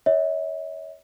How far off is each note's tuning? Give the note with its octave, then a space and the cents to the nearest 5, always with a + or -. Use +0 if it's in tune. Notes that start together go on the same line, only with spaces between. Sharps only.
C#5 +15 E5 -45